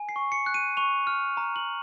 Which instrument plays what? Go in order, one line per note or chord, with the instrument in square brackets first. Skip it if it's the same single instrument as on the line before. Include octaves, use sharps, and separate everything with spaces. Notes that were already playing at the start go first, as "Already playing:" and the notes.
Already playing: [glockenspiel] G#5
C7
C#6
C#7
F#6
D#7
C#6 F7
F6
A#5
F#7